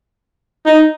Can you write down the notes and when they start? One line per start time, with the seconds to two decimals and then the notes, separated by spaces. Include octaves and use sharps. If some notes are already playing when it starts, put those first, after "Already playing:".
0.66 D#4